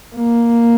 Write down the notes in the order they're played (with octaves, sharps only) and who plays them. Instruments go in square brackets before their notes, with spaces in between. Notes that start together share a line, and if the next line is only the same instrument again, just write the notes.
[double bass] A#3